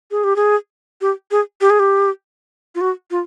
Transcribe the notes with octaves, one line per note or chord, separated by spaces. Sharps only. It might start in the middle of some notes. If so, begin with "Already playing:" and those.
G#4
G4
G#4
G4
G#4
G4
G#4
G4
F4
F#4
F4